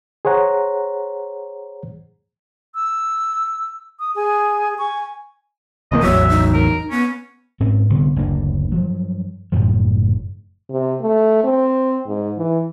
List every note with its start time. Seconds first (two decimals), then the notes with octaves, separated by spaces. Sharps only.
0.25 G#4 C5 C#5 F#5 A#5
2.75 E6
4.00 D#6
4.16 G#4 G#5
4.79 G#5 C#6
5.92 F1 E2 A#3 D#5
6.03 A1 E2 F#3 C#5 E5
6.30 D#4
6.54 A#4
6.91 B3 C#4
7.60 G#2 C4 C#4
7.90 C2 D3 B3
8.16 F#1 D2 A#3 D4
8.72 G2 F3 F#3
9.52 F#1 F#2 A2 F3
10.70 C3
11.01 A3
11.44 C4
12.06 G#2
12.38 E3